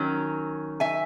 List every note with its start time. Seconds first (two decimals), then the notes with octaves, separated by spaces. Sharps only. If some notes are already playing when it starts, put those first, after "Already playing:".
Already playing: D#3 F#3 C#4
0.80 E5 G#5